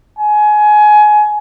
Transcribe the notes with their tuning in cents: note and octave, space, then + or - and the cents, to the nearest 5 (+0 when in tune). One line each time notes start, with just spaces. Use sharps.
G#5 +25